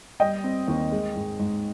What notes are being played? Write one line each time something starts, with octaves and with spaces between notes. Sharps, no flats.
G3 D#5 G5
C4
D#2
G#3
G#2
G#2